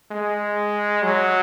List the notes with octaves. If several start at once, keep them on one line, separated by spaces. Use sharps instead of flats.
G#3
F#3